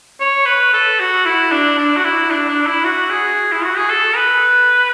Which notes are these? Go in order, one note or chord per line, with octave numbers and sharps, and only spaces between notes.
C#5
B4
A4
F#4
E4
D4
D4
F#4
E4
D4
D4
E4
F#4
G#4
E4
F#4
G#4
A4
B4